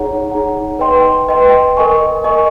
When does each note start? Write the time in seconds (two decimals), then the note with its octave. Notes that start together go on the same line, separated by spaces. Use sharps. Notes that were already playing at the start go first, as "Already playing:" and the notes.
Already playing: D#4 G#4 C#5 F#5 A#5
0.31 D#4 G#4 C#5 F#5 A#5
0.79 B4 D#5 G5 C6
1.28 B4 D#5 G5 C6
1.77 A#4 D#5 G#5 C#6
2.25 A#4 D#5 G#5 C#6